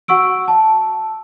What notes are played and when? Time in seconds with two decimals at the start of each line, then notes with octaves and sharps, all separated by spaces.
0.08 F#4 F#5 C#6 E6 D7
0.48 A5